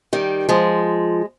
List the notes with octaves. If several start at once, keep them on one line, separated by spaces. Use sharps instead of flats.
D#3 G3
F3 G#3